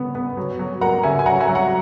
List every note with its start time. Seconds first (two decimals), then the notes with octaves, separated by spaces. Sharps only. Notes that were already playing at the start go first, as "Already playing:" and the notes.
Already playing: C#3 B3
0.15 B3
0.37 F#3
0.59 F#3
0.81 A#3 F#5 A#5
1.03 C#3 E5 G#5
1.19 G#5
1.26 F#3 F#5 A#5
1.40 E5 G#5
1.48 F#3
1.55 F#5 A#5